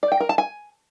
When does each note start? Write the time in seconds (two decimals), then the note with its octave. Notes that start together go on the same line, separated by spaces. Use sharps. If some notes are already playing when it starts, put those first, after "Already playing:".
0.03 D5
0.12 G5
0.20 A#4
0.29 A5
0.38 G#5